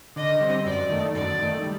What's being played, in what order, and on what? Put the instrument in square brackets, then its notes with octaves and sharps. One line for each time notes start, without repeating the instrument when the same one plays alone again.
[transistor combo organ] D3 [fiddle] D#5
[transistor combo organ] G3 C4
[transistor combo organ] F#2 [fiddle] D5
[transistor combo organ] D#3 A3
[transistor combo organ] F#2 [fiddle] D5
[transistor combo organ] D#3 A3
G3